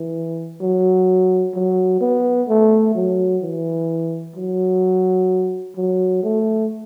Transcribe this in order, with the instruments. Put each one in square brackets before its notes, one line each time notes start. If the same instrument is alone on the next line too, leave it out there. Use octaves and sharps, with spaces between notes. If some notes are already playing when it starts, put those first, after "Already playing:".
Already playing: [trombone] E3
F#3
F#3
B3
A3
F#3
E3
F#3
F#3
A3